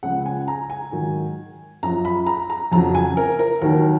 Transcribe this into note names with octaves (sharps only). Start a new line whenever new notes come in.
C#2 C#3 F3 F#5
G#5
A#5
G#5
G#2 D#3 F#3
F#2 F3 A#5
B5
A#5
A#5
F2 C#3 F#3 A#5
G#5
A#4
A#4
D#2 D#3 F#3 A#4